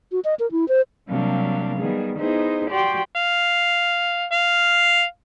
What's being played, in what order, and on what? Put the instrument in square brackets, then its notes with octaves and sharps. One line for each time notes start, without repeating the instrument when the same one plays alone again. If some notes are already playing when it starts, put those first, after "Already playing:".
[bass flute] F#4
D#5
A#4
E4
C5
[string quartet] C3 F#3 G3 A#3 D4 F5
D#3 G3 B3 G#4
B3 D#4 E4 G#4 C5
F#4 G4 D5 G5 C6
[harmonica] F5
F5